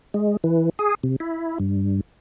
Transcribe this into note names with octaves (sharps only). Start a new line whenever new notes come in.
G#3
E3
G#4
C3
E4
G2